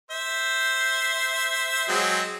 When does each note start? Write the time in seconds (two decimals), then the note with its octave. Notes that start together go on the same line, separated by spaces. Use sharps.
0.11 C5 E5
1.88 F#3 G#3 C4